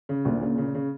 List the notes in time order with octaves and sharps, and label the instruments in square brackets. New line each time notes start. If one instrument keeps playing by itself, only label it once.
[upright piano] C#3
[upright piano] D2 [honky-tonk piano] A#2
[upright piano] C#3
C#3
C#3